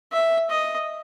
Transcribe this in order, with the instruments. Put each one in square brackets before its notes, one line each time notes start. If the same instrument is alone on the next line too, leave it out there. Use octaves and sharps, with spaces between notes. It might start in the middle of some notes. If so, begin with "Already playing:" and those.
[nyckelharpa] E5
D#5